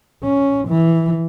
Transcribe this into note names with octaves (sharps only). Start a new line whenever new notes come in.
C#4
E3